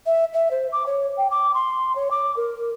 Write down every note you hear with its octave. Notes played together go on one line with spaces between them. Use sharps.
E5
E5
C5
D6
C#5
G5
D6
C6
C#5
D6
A#4